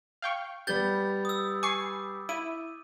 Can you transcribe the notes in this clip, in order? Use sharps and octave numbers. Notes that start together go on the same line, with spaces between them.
F5 G5 C#6
G3 B3 G4 G6 A6 G7
D#6 E6
G#5 C#6 D6 C7
E4 D#7